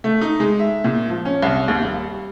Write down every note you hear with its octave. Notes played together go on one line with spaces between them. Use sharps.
A3
D#4
G#3
E5
A#2
F3
C#4
C2
D#2
G3